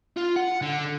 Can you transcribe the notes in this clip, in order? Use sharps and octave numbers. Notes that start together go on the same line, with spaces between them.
F4
F#5
D3